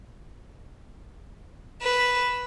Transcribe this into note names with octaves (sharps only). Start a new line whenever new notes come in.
B4 E7